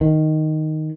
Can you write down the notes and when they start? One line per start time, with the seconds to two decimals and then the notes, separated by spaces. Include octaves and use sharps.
0.01 D#3